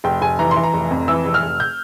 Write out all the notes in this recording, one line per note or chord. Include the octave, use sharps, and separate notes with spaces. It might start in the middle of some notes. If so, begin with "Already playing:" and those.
F1 G5
F1 G#5
E3 A#5
C6
E3
A#5
F1
F2
E3 E6
F1
F6
F1
G6